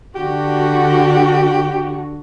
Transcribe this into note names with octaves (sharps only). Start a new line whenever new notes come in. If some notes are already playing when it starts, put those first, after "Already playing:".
D3 F#4 G4